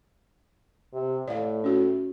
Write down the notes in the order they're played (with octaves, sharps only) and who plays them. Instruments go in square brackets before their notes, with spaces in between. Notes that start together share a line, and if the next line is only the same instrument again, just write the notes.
[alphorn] C3
[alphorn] A2 [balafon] D5 F5
[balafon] C#4 F#4